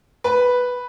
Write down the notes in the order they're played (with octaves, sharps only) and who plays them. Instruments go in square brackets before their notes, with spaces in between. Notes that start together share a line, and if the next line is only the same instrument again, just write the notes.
[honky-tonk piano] B4